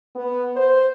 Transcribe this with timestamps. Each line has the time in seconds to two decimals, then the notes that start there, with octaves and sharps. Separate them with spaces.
0.16 B3
0.57 C5